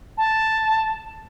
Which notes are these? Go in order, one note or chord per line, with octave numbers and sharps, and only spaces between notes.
A5